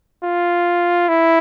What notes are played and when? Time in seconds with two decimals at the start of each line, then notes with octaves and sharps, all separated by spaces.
0.25 F4
1.08 E4